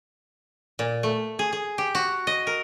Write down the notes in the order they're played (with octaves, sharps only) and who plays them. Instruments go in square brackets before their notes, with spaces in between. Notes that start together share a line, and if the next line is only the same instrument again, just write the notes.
[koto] A#2
A3
G#4
G#4
G4
F#4
D#5
A#4